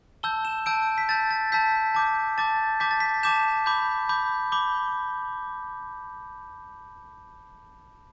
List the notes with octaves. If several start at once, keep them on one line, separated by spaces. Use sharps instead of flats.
A5 E6 G6 G7
E7
A5 E6 G6 D7
B6
A5 E6 G6 A6
A6
A5 E6 G6 B6
A5 D6 G6
A5 D6 G6 A6
A5 D6 G6 B6
A6
B6
A5 D6 G6 E7
B5 D6 G6
B5 D6 G6
B5 D6 G6 G7